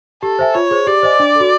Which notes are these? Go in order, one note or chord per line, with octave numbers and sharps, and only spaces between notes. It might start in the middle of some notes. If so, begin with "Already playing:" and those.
G4 A4
C5 E5 G#5
F4 C#5
G#4 C5
G4 D5
C5 D#5 G#5
D4
F#4 A4